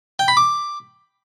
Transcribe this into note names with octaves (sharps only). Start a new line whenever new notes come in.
G5
B5
D6